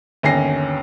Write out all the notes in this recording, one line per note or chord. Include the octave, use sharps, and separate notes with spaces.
G1 D#2 C#4 G#5 A#6 C7